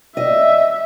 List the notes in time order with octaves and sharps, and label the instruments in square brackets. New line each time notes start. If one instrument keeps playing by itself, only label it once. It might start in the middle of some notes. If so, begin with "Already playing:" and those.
[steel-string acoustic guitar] D#5 [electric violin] E5